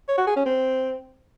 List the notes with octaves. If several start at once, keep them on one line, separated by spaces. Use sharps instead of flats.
C#5
F#4
G#4
C#4
C4